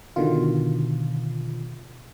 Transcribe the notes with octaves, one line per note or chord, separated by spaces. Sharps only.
B2 D3 D#3 F4